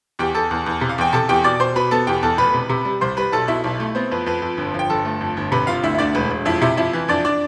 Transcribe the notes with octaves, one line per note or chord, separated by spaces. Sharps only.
E2 G4 G5
E2 A4 A5
E2
E2
C3
F5
E2 G5
C3 A4 A5
E2 G4 G5
B2 D5 D6
B2 C5 C6
B2 B4 B5
B3 A4 A5
E2 G4 G5
E2 A4 A5
F1 B4 B5
C3
C3
G3
C2 C5 C6
G3 B4 B5
B1 A4 A5
B2 E4 E5
B1
A3
B3 C4 C5
F2 B4
F2 B4
F2
G1
F3 G5
G1 A4 A5
A3
F2
G1
C3 B4 B5
G1 F4 F5
D2 E4 E5
E5
D2 D4 D5
E1 B4
E1
F2 E4 E5
C3 E4 E5
F2 E4 E5
E3
F2 D4 D5
D4 D5